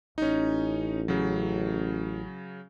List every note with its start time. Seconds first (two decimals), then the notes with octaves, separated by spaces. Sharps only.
0.18 A1 C#4 D#4
1.08 C#3 F#3